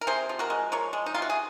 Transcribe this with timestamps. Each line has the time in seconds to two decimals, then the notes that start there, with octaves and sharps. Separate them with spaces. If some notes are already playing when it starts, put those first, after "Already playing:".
0.01 A#4
0.07 C3 G#4 C5
0.29 F3
0.39 F#4 A#4
0.50 G#3
0.72 F3 A#4 C#5
0.93 G#3
1.06 D#4
1.14 C3 F4
1.22 F#4
1.30 G#4